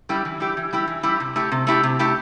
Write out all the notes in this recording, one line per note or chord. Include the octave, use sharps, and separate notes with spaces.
G3 E4 G4
E3
G3 E4 G4
E3
G3 E4 G4
E3
G3 E4 G4
C3
A3 E4 G4
C3
A3 E4 G4
C3
A3 E4 G4